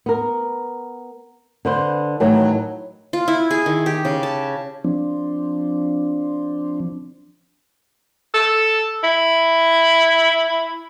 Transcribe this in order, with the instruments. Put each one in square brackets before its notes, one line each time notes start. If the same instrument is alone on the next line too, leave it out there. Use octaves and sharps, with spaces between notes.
[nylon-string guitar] B3 A#4
D3 B4 C5
A2 D#3 E3 F#3
[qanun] F4
E4
G#4
D#3
G4
C#3
A5
[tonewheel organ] F3 C4 D4
[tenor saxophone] A4
E4